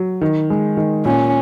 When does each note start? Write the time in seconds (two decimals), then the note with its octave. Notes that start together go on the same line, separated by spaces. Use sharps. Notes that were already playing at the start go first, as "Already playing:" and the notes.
Already playing: F#3
0.21 D#3
0.50 G#3
0.77 D#3
1.05 A#2 C#4